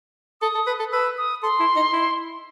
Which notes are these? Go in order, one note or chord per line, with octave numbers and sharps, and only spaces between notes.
A4 D#6
A4
B4
A4
B4 E6
D#6
A4 C6
E4
D#4
E4